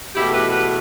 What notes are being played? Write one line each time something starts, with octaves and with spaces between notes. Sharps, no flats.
E2 B2 A3 E4 G4
G4 B4
G4 B4